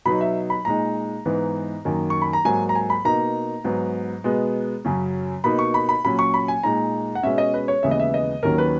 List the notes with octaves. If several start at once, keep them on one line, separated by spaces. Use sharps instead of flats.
B2 F#3 B3 D#4 B5
E5
B5
A#2 G#3 D#4 A#5
G#2 E3 B3 D#4
F#2 D#3 A#3
C#6
B5
A#5
G#2 F#3 A#3 G#5
A#5
G#5
B5
B2 A#3 D#4 A#5
G#2 F#3 B3
B2 G#3 B3
F#2 C#3 F#3 C#4
B2 A#3 D#4 B5
C#6
B5
B5
A#2 F#3 C#4 B5
C#6
B5
G#5
A#2 G#3 D#4 A#5
F#5
B2 G#3 C#4 E5
D#5
B4
C#5
D#2 C#3 E3 G#3 B3 E5
D#5
E5
D#5
D#2 D#3 F#3 C#4 A#4
B4